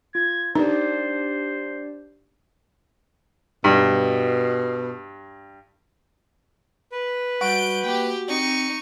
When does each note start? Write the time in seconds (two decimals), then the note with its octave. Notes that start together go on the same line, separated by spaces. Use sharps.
0.15 F4 G#6
0.55 D4 D#4 G4 C5 D5
3.64 G2 B2
6.92 B4
7.41 G3 F#4 G6 D7
7.85 A#3 G4 G5
8.28 C4 D#4 C#6